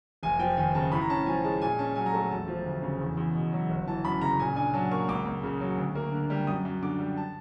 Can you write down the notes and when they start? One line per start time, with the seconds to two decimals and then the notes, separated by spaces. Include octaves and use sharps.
0.23 F1 G#5
0.39 F3 G5
0.57 D#2 G#5
0.75 C#3 A5
0.92 A2 B5
1.01 A#5
1.09 C#4 A5
1.26 F3 G#5
1.43 G#3 A5
1.61 A#2 G#5
1.79 C#4 A5
1.95 F#3 G#5
2.06 A#5
2.14 A3 A5
2.31 E1 A5
2.48 F3
2.65 D2
2.83 C#3
3.01 E2
3.17 E2
3.34 B2
3.53 F#3
3.69 G1
3.87 E3 A5
4.05 F#2 B5
4.21 C#3 A#5
4.39 A#2 G#5
4.56 D4 G#5
4.74 F#3 A5
4.91 A#3 C#6
5.08 C#2 D6
5.25 C#2
5.43 C#3
5.61 F#3
5.77 D2
5.95 A#3
6.12 D3
6.30 G3
6.47 F#2 D#6
6.65 F#2
6.83 D3 D6
6.99 G3
7.17 A5